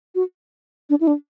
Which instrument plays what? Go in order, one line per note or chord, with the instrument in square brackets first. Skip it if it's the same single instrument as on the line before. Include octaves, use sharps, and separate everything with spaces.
[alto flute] F#4
D4
E4
D4